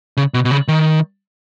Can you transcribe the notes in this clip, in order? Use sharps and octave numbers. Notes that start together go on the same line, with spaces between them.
C#3
B2
B2
C#3
D#3